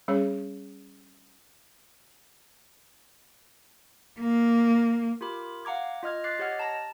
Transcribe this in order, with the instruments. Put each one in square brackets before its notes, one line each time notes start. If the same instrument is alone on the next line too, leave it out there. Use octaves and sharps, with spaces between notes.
[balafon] G3 C#4 G#4 C#5
[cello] A#3
[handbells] F4 G4 A#4 B5 D6
F5 F#5 A#5 D6 G#6
F4 D#5 F6 G#6
D6 F#6 A6 C7
G4 C#5 D#5 F#5 F6
A5 A#5 A#6